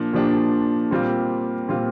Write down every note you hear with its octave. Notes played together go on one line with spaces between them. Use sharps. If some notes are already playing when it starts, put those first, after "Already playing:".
Already playing: A#2 F3 D4
A#2 F3 D4 G4
A#2 G3 C4 F4
A#2 G3 C4 F4